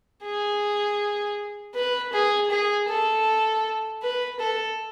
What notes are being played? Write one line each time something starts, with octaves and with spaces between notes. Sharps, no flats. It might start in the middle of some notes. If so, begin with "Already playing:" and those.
G#4
B4
G#4
G#4
A4
B4
A4